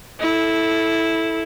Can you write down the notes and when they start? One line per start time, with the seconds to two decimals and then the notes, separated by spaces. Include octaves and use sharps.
0.20 E4 A4